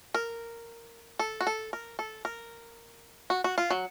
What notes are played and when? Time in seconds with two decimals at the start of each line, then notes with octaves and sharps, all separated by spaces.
0.14 A#4
1.19 A4
1.41 F#4
1.47 A4
1.73 A#4
1.99 A4
2.25 A#4
3.30 F#4
3.44 F#4
3.58 F4
3.71 F#3